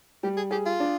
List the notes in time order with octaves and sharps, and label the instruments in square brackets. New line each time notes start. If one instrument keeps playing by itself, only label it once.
[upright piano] G3 [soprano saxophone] G4
[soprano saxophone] G#4
[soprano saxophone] G4 [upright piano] G#4
[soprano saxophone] F4
[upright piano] D4